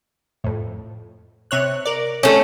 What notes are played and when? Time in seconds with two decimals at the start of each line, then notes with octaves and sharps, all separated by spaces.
0.44 F2 A2
1.51 C3 C#5 F#6
1.85 A#4 D5
2.23 A3 C#4